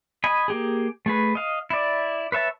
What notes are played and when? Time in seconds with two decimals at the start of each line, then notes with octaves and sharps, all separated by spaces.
0.24 D#5 G#5 B5
0.48 A#3 G4 G#4
1.06 A3 G#4 B4
1.35 D#5 F5
1.70 E4 D5
2.32 B4 C#5 E5 A5